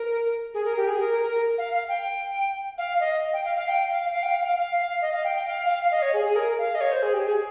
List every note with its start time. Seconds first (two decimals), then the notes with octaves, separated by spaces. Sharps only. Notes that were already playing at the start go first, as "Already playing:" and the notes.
Already playing: A#4
0.54 G#4
0.65 A#4
0.77 G4
0.87 G#4
0.99 A#4
1.21 A#4
1.58 F5
1.73 F5
1.89 G5
2.78 F5
3.00 D#5
3.33 G5
3.45 F5
3.56 F5
3.68 G5
3.90 F5
4.12 F5
4.23 G5
4.34 F5
4.45 F5
4.57 F5
4.79 F5
5.01 D#5
5.13 F5
5.24 G5
5.35 G5
5.47 F5
5.69 F5
5.91 D#5
6.02 C#5
6.13 G#4
6.25 G#4
6.36 A#4
6.58 F5
6.75 D#5
6.81 C#5
6.92 C5
7.02 G#4
7.14 G4
7.25 G#4